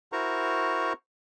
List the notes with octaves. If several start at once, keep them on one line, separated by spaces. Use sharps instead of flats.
E4 F#4 A#4 C5 A#5 C#6